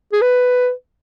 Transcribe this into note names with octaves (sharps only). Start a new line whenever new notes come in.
G#4
B4